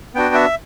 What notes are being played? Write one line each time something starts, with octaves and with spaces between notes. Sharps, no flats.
B3 D4 F#4 G5
E5